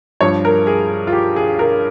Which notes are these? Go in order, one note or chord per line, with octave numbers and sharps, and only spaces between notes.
G2 F3 C#5
A#4
G#4
F4
G4
G#4
A#4